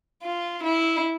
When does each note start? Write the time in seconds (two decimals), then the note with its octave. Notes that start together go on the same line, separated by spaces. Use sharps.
0.23 F4
0.64 E4